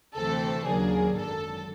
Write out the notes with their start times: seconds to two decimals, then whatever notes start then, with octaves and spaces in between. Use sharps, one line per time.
0.16 D2 C3 E3 A3 C4 A4
0.65 D#2 C#3 F#3 A#3 D4 G#4
1.15 G#1 F#2 D3 A4